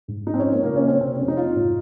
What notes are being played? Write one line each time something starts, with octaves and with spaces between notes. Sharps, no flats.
G#2
F3 D#4
C4
C#4
F3
A#3
C#3 A#3
C#4
F#3
C4
C3 C4
F2 C#4
D#4
F3 F4
G#2